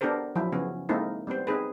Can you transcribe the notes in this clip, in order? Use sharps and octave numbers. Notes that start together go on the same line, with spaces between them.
B3 D4 G4 A4 A#4 C5
F3 F#3 E4
C#3 F3 B3 C#4
G#3 A#3 C4 D#4 E4 A4
G3 B3 C4 C5
C4 D#4 G#4 B4